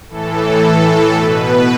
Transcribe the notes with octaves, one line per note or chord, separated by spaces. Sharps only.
A2 E3 A4
A2 E3 A4
B2 B4